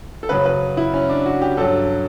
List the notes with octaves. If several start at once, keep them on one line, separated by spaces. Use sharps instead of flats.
A4
F#2 C#3 F#3 B4
B4
E4
C#4
D4
F#4
G4
G2 F#3 A4